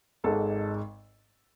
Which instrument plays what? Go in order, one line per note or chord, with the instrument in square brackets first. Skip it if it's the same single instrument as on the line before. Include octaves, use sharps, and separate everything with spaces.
[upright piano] G#1 G#2 G#3 A4